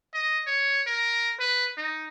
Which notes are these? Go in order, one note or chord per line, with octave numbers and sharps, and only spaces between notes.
D#5
C#5
A#4
B4
D#4